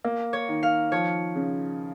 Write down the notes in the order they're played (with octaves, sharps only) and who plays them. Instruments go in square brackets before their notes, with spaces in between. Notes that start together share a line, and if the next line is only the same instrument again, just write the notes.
[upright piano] A#3
[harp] C#5
[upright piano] D#3
[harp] F5
[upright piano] F3 [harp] C#5
[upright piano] C#3